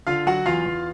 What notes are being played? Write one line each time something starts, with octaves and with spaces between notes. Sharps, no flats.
D3 F4 F5
F#3 F#4 F#5
E2 F4 F5
E2